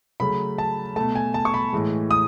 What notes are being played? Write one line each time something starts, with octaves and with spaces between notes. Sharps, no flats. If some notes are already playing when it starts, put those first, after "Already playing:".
C#3 F#3 A3 B5
A5
B2 A3 A5
G#5
A5
C#6
B5
A2 E3 G#3
D#6